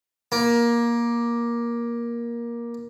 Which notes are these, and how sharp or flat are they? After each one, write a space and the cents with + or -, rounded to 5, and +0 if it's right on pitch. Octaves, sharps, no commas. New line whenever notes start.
A#3 +15